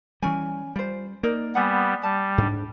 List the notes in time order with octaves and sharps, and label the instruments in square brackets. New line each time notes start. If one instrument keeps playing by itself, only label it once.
[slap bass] E3 G3 [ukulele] C#4 G#5
[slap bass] G3 [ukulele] F4 C5
[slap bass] A#3 [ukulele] D#4 A#4 D5
[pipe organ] G3 B3 [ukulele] F#5 G#5
[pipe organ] G3 [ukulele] A5
[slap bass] G#2 D4